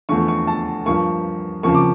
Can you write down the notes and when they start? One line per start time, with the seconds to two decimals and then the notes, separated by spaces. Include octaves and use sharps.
0.09 E2 D3 F3 A3 C#6
0.28 C#6
0.47 A5
0.86 G2 F3 A#3 C#6
1.63 F2 C#3 F3 A#3 C#6
1.75 D6